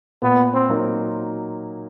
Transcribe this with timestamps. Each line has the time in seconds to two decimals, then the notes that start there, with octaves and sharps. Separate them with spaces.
0.22 A#2 B3
0.54 C4
0.69 F#3 A#3 D#4